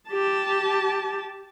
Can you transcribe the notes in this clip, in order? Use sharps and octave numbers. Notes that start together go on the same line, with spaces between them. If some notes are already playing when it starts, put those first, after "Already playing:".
G4 A5